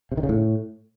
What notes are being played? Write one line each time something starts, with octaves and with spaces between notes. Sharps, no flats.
C3
D#3
C#3
A2